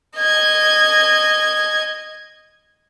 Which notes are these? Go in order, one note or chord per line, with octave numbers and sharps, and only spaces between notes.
D#5 G#6